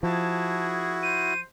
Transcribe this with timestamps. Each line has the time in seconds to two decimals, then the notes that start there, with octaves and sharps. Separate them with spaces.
0.03 F3 E4 F#4 G#4 A5
1.03 C5 D#7